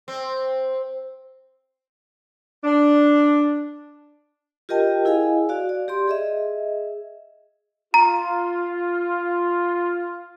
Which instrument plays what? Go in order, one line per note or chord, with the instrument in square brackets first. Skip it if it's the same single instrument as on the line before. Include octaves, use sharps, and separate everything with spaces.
[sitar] C4
[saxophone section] D4
[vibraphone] F4 G4 A#4 D#5 G5 A5
E4 G#4 D#5 F5 G#5
F#4 D5 F5
D5
G4 D5 C6
G#4 D#5 E5
[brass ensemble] F4 [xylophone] A#5